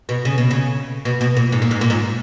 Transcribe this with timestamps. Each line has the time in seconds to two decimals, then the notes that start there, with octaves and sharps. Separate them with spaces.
0.09 B2
0.25 C#3
0.38 B2
0.51 C#3
1.05 B2
1.21 B2
1.37 A#2
1.52 G#2
1.62 A#2
1.71 G#2
1.81 A#2
1.90 G#2